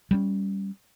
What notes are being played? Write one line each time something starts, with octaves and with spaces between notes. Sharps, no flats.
G3 G#3 C#4